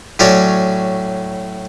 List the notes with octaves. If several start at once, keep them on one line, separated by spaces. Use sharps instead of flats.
A2 F#3 C#4 F#4 C#5 D5